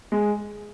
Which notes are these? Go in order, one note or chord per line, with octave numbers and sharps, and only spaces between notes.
G#3